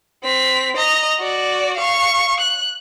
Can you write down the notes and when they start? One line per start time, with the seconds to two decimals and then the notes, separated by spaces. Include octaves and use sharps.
0.23 C4 B6
0.76 D#5 A#5
1.20 F#4 D5
1.77 F5 C#6
2.40 F#6